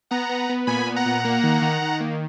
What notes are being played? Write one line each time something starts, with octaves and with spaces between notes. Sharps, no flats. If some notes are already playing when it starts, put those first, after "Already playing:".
B3 F#5 A#5
B3
B3
A#2 G#5 B5
B3
F#5 A#5
A#2
A#3
D#3
D#3
D#3
A#3